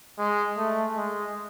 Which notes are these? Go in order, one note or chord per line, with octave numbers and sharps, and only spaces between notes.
G#3
A3
G#3